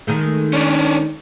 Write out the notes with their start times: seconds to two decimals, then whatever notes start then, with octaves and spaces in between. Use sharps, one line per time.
0.07 D#3 G#3 A3
0.53 C#4 D4